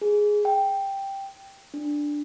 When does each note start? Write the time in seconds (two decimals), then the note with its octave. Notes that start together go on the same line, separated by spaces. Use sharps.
0.02 G#4
0.45 G5
1.74 D4